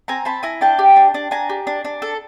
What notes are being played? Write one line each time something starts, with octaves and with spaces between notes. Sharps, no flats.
C4 G#5 A#5
C4 A5 B5
E4 G#5 A#5
D4 G5 A5
G4
D4
D4
D4 G#5 A#5
G4
D4
D4
A4